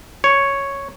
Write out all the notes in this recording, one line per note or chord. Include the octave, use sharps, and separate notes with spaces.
C#5